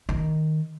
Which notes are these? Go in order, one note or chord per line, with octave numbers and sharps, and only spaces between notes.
D#3